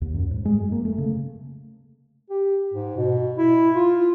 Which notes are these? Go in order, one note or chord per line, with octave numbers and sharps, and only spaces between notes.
D#2
F#2
G#2
G#3
F#2
A#3
A3
C#3
G4
G#2
B2
E4
F4